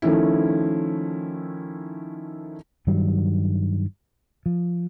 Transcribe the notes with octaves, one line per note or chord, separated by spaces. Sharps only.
D#3 F3 A3 C#4 E4
G2 D#3 F#3 G3
F3